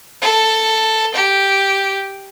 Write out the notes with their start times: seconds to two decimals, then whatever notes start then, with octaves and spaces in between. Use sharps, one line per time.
0.22 A4
1.13 G4